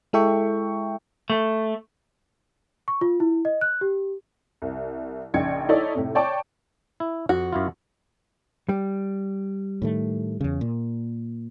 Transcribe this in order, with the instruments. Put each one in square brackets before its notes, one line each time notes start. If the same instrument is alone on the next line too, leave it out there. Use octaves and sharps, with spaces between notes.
[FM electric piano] G#3 E4 A4 E5 G5 C#6
[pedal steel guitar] A3
[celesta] C#6
F4
E4
D#5
F#6
G4
[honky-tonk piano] C2
A#1 C#3 D#4 G5 G#6 C#7
D#4 E4 A4 C#5 D5
A2 C3
C#5 D5 G5 A5 C#6 D6
[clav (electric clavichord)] E4
[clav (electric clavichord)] F2 [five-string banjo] F#4
[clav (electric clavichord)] F#2 E4 F4
[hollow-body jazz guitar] G3
[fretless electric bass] A2 D#3 A3
E2 C#3
A#2